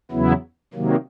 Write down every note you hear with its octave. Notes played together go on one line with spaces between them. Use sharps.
E2 C#3 F#3 B3 E4
C3 D#3 F#3 A#3